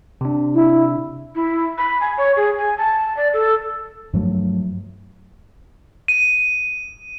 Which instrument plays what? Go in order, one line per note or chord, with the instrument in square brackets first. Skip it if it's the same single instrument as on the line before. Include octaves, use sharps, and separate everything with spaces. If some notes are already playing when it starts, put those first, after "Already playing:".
[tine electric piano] C3 D4
[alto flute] E4
[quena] E4
B5
G#5
C#5
G#4
G#5
A5
D5
A4
[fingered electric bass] G2 F3 F#3 A3
[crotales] D#7